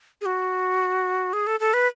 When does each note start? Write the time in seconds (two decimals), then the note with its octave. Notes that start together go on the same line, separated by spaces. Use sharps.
0.21 G#4
0.26 F#4
1.33 G#4
1.47 A4
1.60 A4
1.73 B4